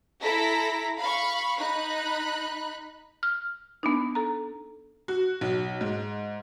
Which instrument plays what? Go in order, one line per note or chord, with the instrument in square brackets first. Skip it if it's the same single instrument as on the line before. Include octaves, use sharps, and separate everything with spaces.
[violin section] E4 A4 A#5 B6
F5 B5 C#6
D#4 B5 F#6
[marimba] F6
B3 D4 D#4
A4 A#5
[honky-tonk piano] F#4
B1
G#2